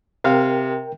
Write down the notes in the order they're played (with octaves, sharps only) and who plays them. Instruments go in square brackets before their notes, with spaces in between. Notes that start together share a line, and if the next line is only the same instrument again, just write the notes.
[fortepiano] C3 F5 [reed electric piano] A#4 G5